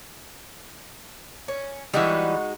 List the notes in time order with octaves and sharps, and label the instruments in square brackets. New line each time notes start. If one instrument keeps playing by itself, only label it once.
[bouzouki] C#4
[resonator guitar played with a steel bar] E3 G3 [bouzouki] G#3 D#4 F#4